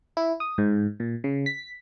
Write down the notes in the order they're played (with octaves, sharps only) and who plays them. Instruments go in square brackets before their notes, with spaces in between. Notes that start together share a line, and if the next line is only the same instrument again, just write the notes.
[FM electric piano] E4
D#6
G#2
A#2
C#3
B6